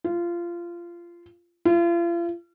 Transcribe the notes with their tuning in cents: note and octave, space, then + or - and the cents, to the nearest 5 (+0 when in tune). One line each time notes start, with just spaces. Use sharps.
F4 -20
F4 -40